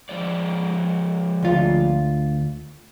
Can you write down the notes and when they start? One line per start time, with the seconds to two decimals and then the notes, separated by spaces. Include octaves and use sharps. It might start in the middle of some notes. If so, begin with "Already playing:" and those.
0.09 F3 G#3 D5
1.42 D2 F4